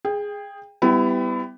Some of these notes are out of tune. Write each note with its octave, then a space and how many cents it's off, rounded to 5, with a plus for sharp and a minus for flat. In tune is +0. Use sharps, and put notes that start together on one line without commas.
G#4 -5 G5 +30
G3 +0 B3 +30 E4 +0